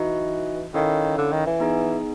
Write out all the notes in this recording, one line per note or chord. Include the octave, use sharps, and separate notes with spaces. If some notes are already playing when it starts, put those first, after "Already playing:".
Already playing: E3 D#4 F#4 B4 D#5
D#3 C#4 E4 A4 C#5 F5
D3
D#3
E3
B3 D#4 G#4